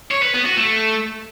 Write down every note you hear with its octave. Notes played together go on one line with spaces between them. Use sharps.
C#5
B4
B3
F#4
A3